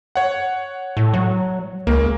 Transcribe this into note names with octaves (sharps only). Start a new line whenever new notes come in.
C#5 F#5
A2
F#3
C#2 A#3